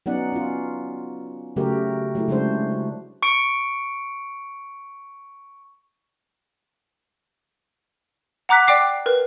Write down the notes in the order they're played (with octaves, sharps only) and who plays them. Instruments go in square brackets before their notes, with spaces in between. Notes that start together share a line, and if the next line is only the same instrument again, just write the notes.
[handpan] F#3 B3 C#4 D#4 D5 F#5
C#4 F4
C#3 F#3 A3 F#4 G4 A#4
F#3 A3 E4
C#3 F#3 G#3 D4 F#4 C5
[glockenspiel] C#6 C#7 D7
[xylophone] F#5 A#5 D6 F#6 B6
D5 G5 D6 C7
A#4 B4